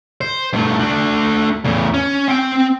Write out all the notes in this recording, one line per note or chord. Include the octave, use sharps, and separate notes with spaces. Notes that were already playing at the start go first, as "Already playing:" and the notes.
C5
G2 A3
A3 D4
E2 A2
C#4
C4 G5